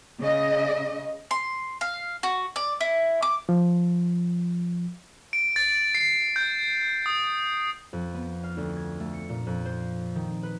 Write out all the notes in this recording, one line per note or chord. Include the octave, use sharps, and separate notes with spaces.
C#3 D#5
C6
F5
F#4
D5
E4
D6
F3
D7
A6
C7
G6
D#6
F2
B3
F5
D2
G#6
A3
C#7
A#2
F2
C5
D#3
B4